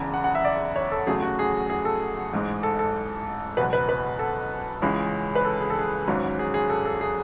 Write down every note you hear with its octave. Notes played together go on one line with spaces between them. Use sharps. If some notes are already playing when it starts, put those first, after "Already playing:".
Already playing: E1 E2 C#3
F#5
F#5
E5
D5
C#5
A4
E2 C#3 F#3 A3 G#4
F#4
G#4
G#4
A4
A1 G#2 G#3
A4
A4
F#1 E2 B2 B4
B4
B4
A4
C#2 C#3 E3 G#3 C#4
B4
A4
G#4
A4
G#4
G#1 G#2 F#3 C#4
G#4
G#4
A4
A4
G#4